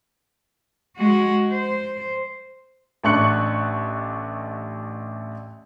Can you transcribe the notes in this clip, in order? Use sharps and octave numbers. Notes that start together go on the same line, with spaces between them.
G#3 F#4
C5
A1 A3 D4 C#6 F#6 C#7